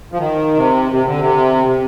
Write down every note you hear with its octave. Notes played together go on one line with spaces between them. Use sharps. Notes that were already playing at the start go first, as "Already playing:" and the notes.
F3
D#3
C3
C3
D3
C3
C3